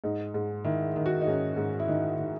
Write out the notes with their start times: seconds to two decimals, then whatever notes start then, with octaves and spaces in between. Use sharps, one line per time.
0.04 G#2 D#4
0.34 G#2
0.64 D#3 E4
0.96 D#3
1.06 F#4
1.21 D#4
1.27 G#2 C#4
1.57 G#2
1.80 E4
1.88 D#3 D#4
2.19 D#3